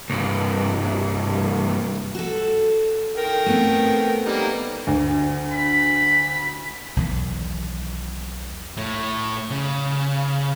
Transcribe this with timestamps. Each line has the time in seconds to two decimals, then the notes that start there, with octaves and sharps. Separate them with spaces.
0.10 C2 G2
2.15 F#4 A4
3.18 A#4 G5
3.46 A3 B3 C4
4.26 G3 A#3 D#4
4.87 D2
5.52 B5
6.97 B1 E2 D#3
8.77 A2
9.51 C#3